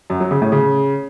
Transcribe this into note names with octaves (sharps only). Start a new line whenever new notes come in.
F#2
F#3
C#3
A2
C#3